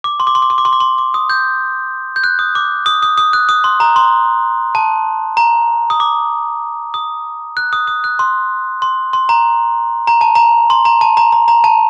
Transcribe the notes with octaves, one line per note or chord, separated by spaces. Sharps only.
D6
C6
D6
C6
D6
C6
D6
C6
D6
C6
D6
D#6
G6
G6
F#6
D#6
D6
D#6
D#6
D#6
F#6
D#6
C6
A#5
C6
A5
A#5
D#6
D6
D#6
F#6
D#6
D#6
F#6
C6
C6
C6
A#5
A#5
A5
A#5
C6
A#5
A5
A#5
A#5
A#5
A5